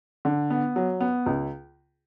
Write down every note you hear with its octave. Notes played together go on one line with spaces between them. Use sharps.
D3
B3
F#3
B3
C#2